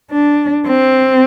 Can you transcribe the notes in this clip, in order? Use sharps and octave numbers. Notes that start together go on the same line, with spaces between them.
D4
C4